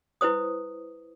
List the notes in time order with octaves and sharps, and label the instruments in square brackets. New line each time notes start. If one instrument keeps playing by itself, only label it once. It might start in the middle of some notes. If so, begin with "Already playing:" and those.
[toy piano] E4 B4 C5 D#6